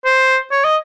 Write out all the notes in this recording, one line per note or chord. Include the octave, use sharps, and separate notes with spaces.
C5
C#5
D#5